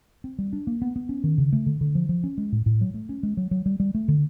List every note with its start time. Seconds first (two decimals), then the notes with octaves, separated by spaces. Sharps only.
0.24 C4
0.39 G3
0.53 D4
0.67 A#3
0.82 B3
0.96 B3
1.09 C#4
1.24 D#3
1.38 C#3
1.53 A3
1.66 D3
1.81 D3
1.95 F3
2.09 F3
2.24 C#4
2.38 G#3
2.52 A2
2.66 A2
2.81 F#3
2.94 A3
3.09 C#4
3.23 G#3
3.37 F#3
3.51 F#3
3.66 G3
3.80 G3
3.95 A3
4.08 D3